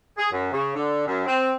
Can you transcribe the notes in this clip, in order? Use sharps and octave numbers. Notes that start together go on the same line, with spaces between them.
G#4
F#2
C#3
D3
F#2
C4